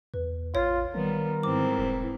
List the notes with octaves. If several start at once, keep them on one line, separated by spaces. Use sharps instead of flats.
E2 B4
A1 F4 C#5
D#3 G3 B3 A#4
G#2 E3 C4 D6
E1